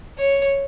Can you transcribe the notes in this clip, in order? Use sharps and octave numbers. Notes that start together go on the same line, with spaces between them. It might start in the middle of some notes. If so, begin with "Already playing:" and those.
C#5